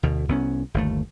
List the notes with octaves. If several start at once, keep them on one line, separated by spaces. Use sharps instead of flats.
D2 B2
C2 B3 C#4
G1 D#2 A3